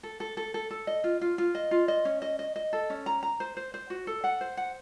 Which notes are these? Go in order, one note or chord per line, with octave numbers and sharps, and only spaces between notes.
A4
A4
A4
A4
A4
D#5
F4
F4
F4
D#5
F4
D#5
C#4
D#5
D#5
D#5
A4
C#4
A#5
A#5
C5
C5
C5
F#4
A4
F#5
C5
F#5